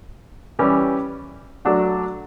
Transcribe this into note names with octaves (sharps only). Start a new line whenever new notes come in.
E3 G3 C#4 G4
F#3 A3 D4 F#4